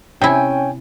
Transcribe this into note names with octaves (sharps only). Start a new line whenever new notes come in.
C3 C#4 E4 G5 G#5